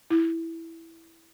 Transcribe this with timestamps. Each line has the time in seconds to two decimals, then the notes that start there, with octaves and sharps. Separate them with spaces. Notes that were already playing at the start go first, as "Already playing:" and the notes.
0.10 E4